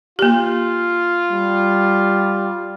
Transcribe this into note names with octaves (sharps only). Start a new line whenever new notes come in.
A#3 F4 G4
G3